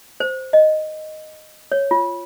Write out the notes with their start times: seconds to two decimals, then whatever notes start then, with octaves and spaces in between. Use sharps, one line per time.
0.20 C5
0.53 D#5
1.72 C#5
1.91 F4